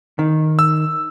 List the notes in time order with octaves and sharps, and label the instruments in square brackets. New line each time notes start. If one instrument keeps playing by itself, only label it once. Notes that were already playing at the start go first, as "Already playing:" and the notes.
[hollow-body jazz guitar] D#3
[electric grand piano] E6